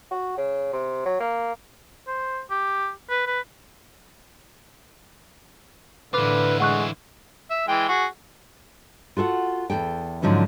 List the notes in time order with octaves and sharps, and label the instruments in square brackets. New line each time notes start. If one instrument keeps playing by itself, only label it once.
[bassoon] F#4
C#3
C3
F#3
A#3
[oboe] C5
G4
B4
B4
[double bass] A2 D3 [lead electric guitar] E3 F4 [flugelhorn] B4 [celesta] D6
[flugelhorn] G#3 [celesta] F#5 C#6 F#6
[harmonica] E5
E3 G#3 G5
F#4 G#4
[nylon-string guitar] F4 F#4 A4 F#5
E2 C3 A4 G5
G#2 D3 F3 F#3 C#4 D#4